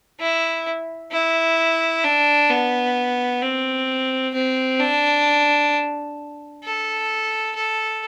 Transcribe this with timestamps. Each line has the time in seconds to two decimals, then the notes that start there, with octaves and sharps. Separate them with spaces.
0.20 E4
1.12 E4
2.04 D4
2.50 B3
3.42 C4
4.34 C4
4.80 D4
6.63 A4
7.55 A4